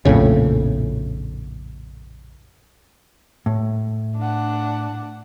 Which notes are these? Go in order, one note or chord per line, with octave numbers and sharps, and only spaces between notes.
A#1 F2 A2 C#3
A2
D4 F#5